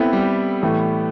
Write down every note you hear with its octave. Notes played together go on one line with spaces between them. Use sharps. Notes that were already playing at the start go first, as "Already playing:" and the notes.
Already playing: B3 C4 E4 A4
G3
A2 E3 A3